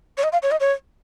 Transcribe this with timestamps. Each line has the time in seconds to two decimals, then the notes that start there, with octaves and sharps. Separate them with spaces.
0.18 C#5
0.23 D#5
0.32 F5
0.42 C#5
0.51 D#5
0.60 C#5